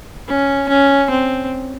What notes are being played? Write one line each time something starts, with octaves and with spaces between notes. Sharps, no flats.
C#4
C#4
C4